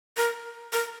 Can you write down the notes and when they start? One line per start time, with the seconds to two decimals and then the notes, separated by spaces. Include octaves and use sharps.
0.17 A#4
0.73 A#4